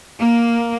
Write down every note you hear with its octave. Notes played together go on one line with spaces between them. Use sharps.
A#3